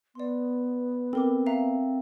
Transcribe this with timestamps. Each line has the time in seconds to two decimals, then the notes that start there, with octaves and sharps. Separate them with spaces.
0.15 B3 D5 C6
1.13 C4 A4 A#4 D6
1.46 E5 F5 A#5